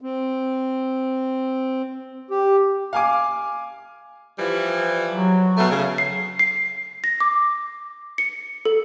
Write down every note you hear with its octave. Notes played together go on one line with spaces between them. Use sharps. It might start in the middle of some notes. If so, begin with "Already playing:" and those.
C4
G4
F5 G#5 D6
E3 F3 G3
F#3
B2 A3
C#3
C7
C7
A#6
D6
C#7
A4